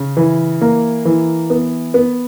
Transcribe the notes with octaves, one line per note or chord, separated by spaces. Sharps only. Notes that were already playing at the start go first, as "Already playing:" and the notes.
Already playing: C#3
E3
A#3
E3
B3
B3